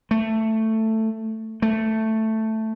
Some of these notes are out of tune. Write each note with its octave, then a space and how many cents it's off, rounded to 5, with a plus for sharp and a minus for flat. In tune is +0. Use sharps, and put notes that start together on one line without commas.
A3 +10
A3 +5